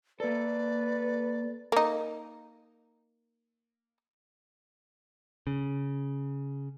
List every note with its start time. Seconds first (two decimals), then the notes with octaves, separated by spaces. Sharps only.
0.20 A#3 A4 B4 D5
1.72 A#3 D#4
5.47 C#3